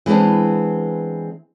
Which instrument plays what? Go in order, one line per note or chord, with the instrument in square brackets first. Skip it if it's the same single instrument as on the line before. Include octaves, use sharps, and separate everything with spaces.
[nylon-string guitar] E3 G#3 B3 C4 D4